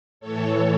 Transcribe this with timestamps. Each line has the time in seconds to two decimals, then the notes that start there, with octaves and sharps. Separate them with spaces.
0.20 A2 E3 A4 C#5